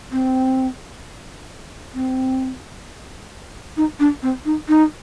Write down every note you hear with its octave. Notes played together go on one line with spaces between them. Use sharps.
C4
C4
D#4
D4
C4
D#4
D#4